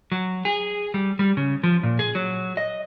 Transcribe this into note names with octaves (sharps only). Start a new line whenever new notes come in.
F#3
G#4
G3
G3
C#3
F3
A#2
G#4
F#3
D#5